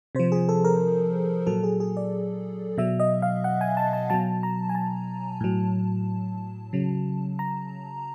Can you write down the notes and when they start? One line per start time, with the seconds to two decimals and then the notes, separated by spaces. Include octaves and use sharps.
0.15 C3 F3 C5
0.32 G#4
0.49 A4
0.65 A#4
1.47 A#2 F#3 A4
1.64 G#4
1.80 G#4
1.97 D5
2.78 B2 F#3 E5
3.00 D#5
3.22 F5
3.44 F#5
3.61 G#5
3.77 A5
3.93 A5
4.10 B2 F#3 A5
4.43 A#5
4.69 G#5
4.75 A5
5.41 A2 F#3
6.73 C#3 F#3
7.39 A#5